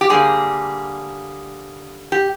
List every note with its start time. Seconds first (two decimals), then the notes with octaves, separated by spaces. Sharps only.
0.01 G4
0.09 D3 G3 A#3 G#4
2.12 G4